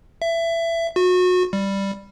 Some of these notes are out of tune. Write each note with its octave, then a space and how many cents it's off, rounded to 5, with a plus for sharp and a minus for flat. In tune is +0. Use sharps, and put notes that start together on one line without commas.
E5 +20
F#4 -30
G3 +5